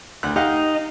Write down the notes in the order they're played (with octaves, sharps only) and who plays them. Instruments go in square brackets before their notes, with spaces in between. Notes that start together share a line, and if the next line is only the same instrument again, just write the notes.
[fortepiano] D2 F#6
[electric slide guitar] D#4 [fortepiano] G4 F5 F#5